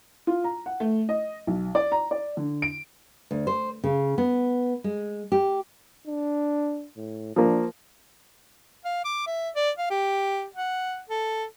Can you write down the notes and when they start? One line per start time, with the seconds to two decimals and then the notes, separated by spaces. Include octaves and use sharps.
0.27 F4
0.44 A#5
0.66 F#5
0.80 A3
1.09 D#5
1.47 B1
1.75 D5
1.92 A#5
2.11 D5
2.37 D3
2.62 D7
3.31 D2
3.47 C5
3.84 C#3
4.18 B3
4.84 G#3
5.32 G4
6.07 D4
6.97 A2
7.36 F3 A#3 D4
8.85 F5
9.04 D6
9.27 E5
9.56 D5
9.78 F5
9.90 G4
10.55 F#5
11.10 A4